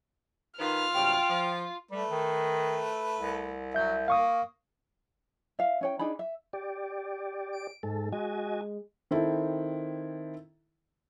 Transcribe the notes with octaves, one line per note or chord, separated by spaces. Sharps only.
D#3 F4 B4 F6
G2 C3 F#3 G5
F3
G3 A3 B4
D#3
C2
F#3 E5 G6
A#3 F5 C#6 D#6
E5 F5
C#4 C#5 G5
D4 D#4 G#4 B5
E5
G4 D5
D7
G#2 G#3 A4
G#3 F#4 D#5 G#5
D#3 C4 E4 A4